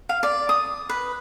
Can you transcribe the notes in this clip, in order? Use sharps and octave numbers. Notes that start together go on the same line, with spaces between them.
F5
D5
D#6
B4